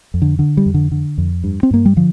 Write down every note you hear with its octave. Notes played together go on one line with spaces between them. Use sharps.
F2
D3
D3
G3
F2
D3
D3
F2
G2
C4
G2 A#3
G3
D3 F3